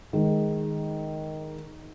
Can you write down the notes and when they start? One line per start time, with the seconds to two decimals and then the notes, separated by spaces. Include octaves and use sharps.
0.13 D#3 G#3